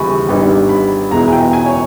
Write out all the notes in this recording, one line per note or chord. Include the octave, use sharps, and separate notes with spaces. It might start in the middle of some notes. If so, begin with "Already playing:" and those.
Already playing: D#2 C#3 E3 G3 G#5 B5 C#6
G#1 G2 G3 B3 D#4
B5
E2 B2 G#3 B3 E4 A#5
G#5
G5
G#5
C#5